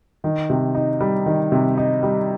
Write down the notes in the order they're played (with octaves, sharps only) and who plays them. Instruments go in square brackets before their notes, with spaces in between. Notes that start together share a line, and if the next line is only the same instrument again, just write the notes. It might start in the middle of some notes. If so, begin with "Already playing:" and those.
[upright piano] D#3
C3
D#4
G3
D#3
C3
D#4
G3